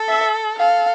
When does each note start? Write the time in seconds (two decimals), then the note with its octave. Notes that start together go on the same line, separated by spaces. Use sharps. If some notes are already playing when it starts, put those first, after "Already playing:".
Already playing: A4
0.08 E5
0.58 A4 F5